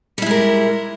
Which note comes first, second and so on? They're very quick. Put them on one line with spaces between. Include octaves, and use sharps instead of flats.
G3 E4 G#3 A#4